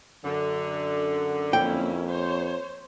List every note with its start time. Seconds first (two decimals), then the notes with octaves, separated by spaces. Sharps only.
0.24 F#2 D3
1.53 F2 A#3 C#4 E4 G5
2.09 C5 C#5